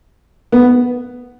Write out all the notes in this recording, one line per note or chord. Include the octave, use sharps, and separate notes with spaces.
B3